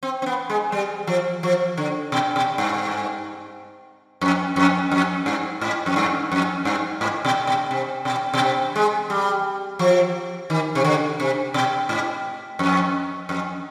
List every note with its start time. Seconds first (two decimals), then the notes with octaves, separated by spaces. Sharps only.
0.03 C4
0.22 C4
0.26 B3
0.50 G#3
0.72 G3
1.07 F3
1.43 F3
1.77 D3
2.12 B2
2.36 B2
2.58 G2
4.21 F2
4.56 F2
4.91 F2
5.26 G2
5.61 G#2
5.86 F2
5.96 G2
6.32 F2
6.65 G2
7.01 G#2
7.25 B2
7.47 B2
7.71 C3
8.05 B2
8.34 B2
8.41 C3
8.76 G#3
9.10 G3
9.79 F3
10.50 D#3
10.75 C3
10.84 D3
11.20 C3
11.54 B2
11.89 G#2
12.59 F2
13.29 F2